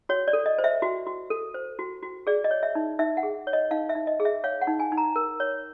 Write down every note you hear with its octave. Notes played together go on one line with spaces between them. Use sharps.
F#4 C#5
D5
A4
D#5
C5
E5
F#4
F#4
A4
C5
F#4
F#4
G#4 D5
D#5
C#5
E5
D#4
D#4 E5
F#5
G#4
C#5
D#5
D#4 F5
E5
D#4
D#5
G#4
E5
C#5 F5
F#5
D#4
G#5
D#4
A#5
A#4
C#5